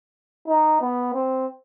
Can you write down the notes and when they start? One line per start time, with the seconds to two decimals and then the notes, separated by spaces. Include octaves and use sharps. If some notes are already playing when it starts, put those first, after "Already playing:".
0.48 D#4
0.81 B3
1.14 C4